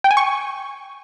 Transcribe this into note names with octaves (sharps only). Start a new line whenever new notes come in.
G5
G#5
C#6